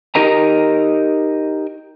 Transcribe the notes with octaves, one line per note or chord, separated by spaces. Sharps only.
D#4 G4 A#4 D#5 A#5